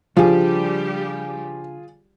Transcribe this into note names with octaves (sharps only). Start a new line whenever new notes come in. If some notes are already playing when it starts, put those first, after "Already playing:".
C#3 F3 G3 D4 F4 G4 G#4